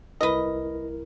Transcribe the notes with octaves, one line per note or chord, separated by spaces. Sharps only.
C2 E4 A#4 B4 D#5